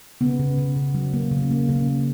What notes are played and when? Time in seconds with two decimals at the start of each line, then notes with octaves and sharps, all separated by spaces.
0.21 C#3 B3
0.39 C#3
0.58 C#3
0.76 C#3
0.94 F#3
1.13 A#3
1.31 C#3
1.51 A#3
1.69 C#3 A#3
1.88 A#3